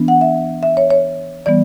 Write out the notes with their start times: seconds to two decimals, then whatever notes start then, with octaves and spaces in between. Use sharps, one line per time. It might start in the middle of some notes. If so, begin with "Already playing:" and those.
Already playing: E3 B3 D4
0.08 F#5
0.21 E5
0.63 E5
0.77 C#5
0.90 C#5
1.46 E3 G3 B3 D5